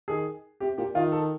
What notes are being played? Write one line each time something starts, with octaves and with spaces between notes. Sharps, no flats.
D#3 G#4
C3 G4
A#2 G4
D#3 F4
A4